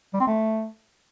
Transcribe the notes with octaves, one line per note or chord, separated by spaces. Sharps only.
G3
C4
A3